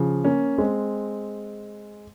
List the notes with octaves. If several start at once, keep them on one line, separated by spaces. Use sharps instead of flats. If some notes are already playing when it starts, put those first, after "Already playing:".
Already playing: C#3 F3
A#3 C#4
G#3 C4